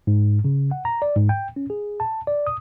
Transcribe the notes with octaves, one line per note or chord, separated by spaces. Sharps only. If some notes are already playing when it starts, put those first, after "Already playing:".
G#2
C#3
F#5
A#5
D5
G#2
G5
C#4
G#4
A5
D5
D#6